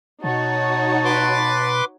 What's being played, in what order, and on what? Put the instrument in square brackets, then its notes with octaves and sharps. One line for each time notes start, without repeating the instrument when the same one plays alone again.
[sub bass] B2 [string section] D#4 F#4 C#5 [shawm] A5
[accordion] B4 C6 D6